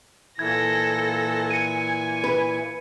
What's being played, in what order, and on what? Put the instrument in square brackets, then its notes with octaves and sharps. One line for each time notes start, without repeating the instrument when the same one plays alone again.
[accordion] A#2 E3 E4 [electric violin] A4 A#6 [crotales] G#6
[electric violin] G#5 [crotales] C#7 D#7
[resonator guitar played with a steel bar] B4